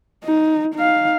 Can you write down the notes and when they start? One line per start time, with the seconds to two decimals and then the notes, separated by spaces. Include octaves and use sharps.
0.24 D#4
0.75 D#4 F5